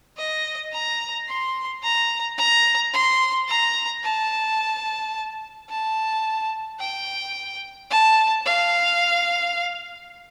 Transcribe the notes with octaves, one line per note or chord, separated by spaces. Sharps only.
D#5
A#5
C6
A#5
A#5
C6
A#5
A5
A5
G5
A5
F5